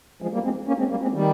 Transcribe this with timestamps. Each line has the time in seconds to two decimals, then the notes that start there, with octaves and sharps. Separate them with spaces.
0.22 F3 G#3
0.33 G3 A#3
0.44 G#3 C4
0.68 A#3 C#4
0.78 G#3 C4
0.90 G3 A#3
1.02 G#3 C4
1.13 D#3 G3